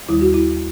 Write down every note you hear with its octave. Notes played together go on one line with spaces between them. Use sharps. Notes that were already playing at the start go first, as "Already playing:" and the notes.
D#2 D#3 G3 E4
F#4
E4